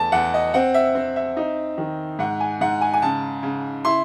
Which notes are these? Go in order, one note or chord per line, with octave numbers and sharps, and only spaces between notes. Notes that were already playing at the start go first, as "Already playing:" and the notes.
Already playing: E2 A3 A5
E2 F#5
D#5
C4 F#5
E5
C4
E5
D#4
D#3
G#2 F#5
G#5
G#2 F#5
G#5
G#5
C#3 A5
C#3
E4 C6